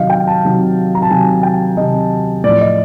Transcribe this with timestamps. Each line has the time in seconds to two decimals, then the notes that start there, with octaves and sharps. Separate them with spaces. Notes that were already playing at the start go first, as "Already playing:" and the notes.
Already playing: C3 D#3 F#3 D#5 F5
0.10 G5
0.27 A5
0.44 C3 D#3 F#3
0.95 A#5
1.02 A5
1.10 C3 D#3 F#3 G#5
1.43 G5
1.77 C3 D#3 F#3 D#5
2.44 A2 F3 D5
2.61 D#5